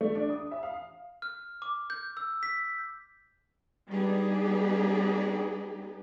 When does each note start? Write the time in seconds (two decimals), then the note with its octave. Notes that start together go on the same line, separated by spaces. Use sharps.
0.01 A3
0.15 D4
0.30 D#6
0.51 E5
0.63 F5
1.22 F6
1.62 D6
1.90 G6
2.17 E6
2.43 B6
3.90 G3 B3 D4 D#4 G4 G#4